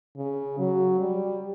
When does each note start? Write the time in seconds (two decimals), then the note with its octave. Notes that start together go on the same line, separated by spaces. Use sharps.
0.17 C#3
0.58 F#3
1.00 G3